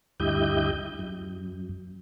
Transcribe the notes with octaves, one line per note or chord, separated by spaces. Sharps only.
D2 G2 E4 G4 D#5 G6
F#2